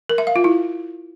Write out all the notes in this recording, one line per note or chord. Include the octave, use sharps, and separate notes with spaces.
A#4
E5
F5
F4
E4